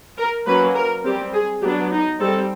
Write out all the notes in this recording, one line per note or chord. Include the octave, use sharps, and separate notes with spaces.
A#4
F#3 A#3 C#4 B4
A#4
G3 C4 G4
G#4
F#3 B3 D4 G4
D#4
G3 C4 A4